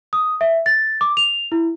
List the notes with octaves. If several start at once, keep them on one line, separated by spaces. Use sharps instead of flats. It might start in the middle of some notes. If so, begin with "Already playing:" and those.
D#6
E5
A6
D6
F7
E4